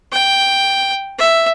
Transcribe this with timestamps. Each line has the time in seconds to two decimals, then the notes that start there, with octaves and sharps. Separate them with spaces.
0.13 G5
1.19 E5